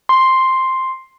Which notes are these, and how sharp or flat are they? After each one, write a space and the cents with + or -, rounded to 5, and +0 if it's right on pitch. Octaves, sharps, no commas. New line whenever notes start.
C6 +5